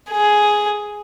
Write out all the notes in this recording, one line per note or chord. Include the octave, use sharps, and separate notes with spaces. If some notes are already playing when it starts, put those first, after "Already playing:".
G#4